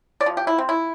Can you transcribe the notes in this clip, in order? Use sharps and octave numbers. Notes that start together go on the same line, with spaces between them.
D5
C3 F3
G4
E4
C4
E4